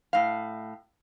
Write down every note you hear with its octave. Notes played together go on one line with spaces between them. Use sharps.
A2 F5